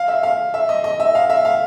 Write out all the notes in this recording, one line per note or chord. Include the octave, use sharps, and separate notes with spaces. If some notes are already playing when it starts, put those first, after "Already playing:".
Already playing: F5
E5
F5
E5
D#5
D#5
E5
F5
E5
F5